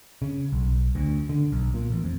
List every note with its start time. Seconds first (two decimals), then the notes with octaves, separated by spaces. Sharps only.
0.22 C#3
0.52 B1
0.95 D2
1.29 D3
1.52 B1
1.74 A#2
1.90 A1
2.04 F2